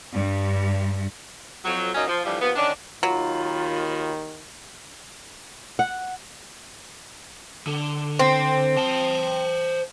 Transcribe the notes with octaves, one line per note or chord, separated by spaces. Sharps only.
G2
F2 F#3
F#2 A#2 F#3 C#4 D#4
F3
A2 D3 E3 F3 G3
D#2 F3 B3
D3 D#3 C#4 D4
D#2 D#3 F#3 F4 B5
F#5
D3
C4
C5 A5